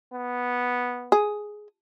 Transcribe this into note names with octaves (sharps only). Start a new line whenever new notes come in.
B3
G#4